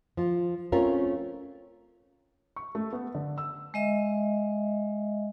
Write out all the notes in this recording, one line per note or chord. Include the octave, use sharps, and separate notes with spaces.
F3 F4
A3 C4 C#4 F4 A#4
C#6
A3
B3
D3
E6
G#3 D#5 E5